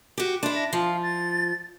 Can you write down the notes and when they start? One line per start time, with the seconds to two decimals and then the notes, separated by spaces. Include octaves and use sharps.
0.18 F#4 G4
0.43 D4 E4 C6
0.55 A#6
0.73 F3 F4
1.03 A6